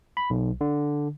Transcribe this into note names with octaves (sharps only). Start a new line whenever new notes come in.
B5
B1
D3